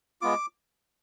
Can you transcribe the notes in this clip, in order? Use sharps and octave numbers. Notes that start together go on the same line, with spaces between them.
G#3 B3 F4 D6